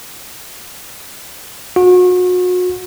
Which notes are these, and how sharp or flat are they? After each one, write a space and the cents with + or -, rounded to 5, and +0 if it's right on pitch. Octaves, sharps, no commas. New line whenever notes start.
F#4 -35